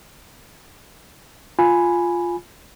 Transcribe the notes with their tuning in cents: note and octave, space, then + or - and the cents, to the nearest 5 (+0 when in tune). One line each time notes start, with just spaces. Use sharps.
F4 +0 G#5 +0 B5 +0